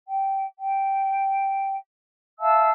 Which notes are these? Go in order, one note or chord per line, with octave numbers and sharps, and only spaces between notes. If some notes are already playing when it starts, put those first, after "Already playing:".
G5
G5
E5 F5 A5 E6